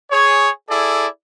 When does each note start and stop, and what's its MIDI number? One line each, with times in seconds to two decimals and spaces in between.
0.11 0.50 68
0.11 0.50 73
0.69 1.07 64
0.69 1.07 68
0.69 1.07 69
0.69 1.07 74